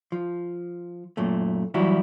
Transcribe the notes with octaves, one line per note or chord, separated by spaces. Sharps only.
F3
F#2 A#2 A3
E3 F#3 G3 E4 F#4